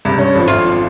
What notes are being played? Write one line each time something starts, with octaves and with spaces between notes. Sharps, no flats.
C#2 G2 C3
G2 C#4
G#1 F2 F3
F4